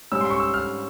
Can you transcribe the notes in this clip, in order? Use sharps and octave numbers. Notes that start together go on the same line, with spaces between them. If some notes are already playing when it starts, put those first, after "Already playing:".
G#2 G3 C#4 E6
C6
C#6
E6
F6